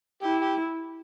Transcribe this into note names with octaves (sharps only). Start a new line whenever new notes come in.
E4 G4
G4